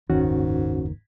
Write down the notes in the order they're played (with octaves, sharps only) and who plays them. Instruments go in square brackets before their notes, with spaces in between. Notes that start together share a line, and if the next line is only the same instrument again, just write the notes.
[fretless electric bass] F#1 D#2 D#3 [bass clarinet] G#2 [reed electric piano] C#4 F#4